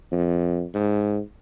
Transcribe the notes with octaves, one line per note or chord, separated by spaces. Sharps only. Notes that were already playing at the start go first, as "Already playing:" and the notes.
F2
G#2